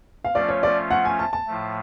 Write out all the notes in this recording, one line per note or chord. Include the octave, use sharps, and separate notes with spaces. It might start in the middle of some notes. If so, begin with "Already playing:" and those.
F5
F3 A3 C#4 F4 D5
C#5
D5
F#5
G#5
A5
A5
A2 F3 A3